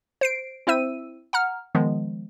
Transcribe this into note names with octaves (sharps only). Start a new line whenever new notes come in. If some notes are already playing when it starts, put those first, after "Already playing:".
C5 C7 D7
C4 E4 C5 E5 E6 D#7
F#5 A#5 F6
D#3 F3 G#3 B3